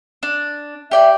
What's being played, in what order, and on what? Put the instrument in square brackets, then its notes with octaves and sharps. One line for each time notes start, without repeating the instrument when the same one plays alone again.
[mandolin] D4
[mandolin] G4 D5 G5 [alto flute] E5